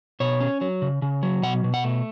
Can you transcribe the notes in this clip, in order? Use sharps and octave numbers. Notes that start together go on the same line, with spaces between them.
B2 C#5
C#4
F#3
C#3
C#3
F#3
B2 F#5
B2
F#5
A3